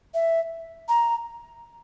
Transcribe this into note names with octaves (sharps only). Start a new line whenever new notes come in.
E5
A#5